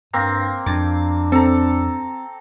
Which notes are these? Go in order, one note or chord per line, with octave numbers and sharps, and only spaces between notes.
G2 A#3 C4
F2 D4 D6
C4 A4 A#5